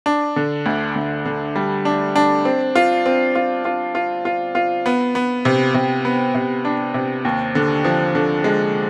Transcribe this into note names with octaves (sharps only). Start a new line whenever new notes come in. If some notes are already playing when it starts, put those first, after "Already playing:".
D4
D3
D2
D2
D3
G3
D4
D4
C4
F4
C4
F4
F4
F4
F4
F4
B3
B3
C3
C3
B3
C3
D4
C3
D#2
D3
F3
D3
G#3